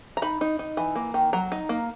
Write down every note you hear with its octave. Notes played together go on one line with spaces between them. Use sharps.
A#5
D#4 B5
D#4
D#4
E3
A#3
D#3
F#3 A#5
D#4
A#3